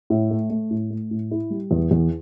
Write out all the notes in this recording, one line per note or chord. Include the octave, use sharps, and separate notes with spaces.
A2
A3
A3
A2
A3
A2
E4
G3
E2
E2